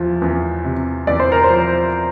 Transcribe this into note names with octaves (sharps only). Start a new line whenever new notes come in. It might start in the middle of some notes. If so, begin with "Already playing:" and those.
Already playing: E2 F3
E2
C3
E2 D5
C5
A#4
C5
F3